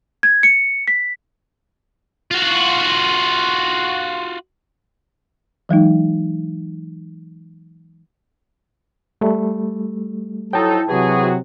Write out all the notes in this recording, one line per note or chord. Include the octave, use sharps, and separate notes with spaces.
G#6
C#7
B6
F4 F#4
E3 F#3 G#3 D#4
G3 A3
F3 F#3 D#4 E4 A4 G5 A5
C3 E3 F#3 F#4 G#4